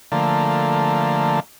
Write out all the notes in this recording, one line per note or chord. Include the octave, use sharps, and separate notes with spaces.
D3 F3 A3 A#3